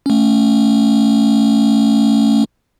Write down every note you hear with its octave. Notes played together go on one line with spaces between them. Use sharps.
A3 C#4